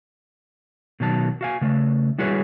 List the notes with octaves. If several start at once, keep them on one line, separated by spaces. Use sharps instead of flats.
B2 D#3 F#3 A5
F#4 F5 G#5
C#3 A3
G3 E4 F#4 G#4 B4 C#5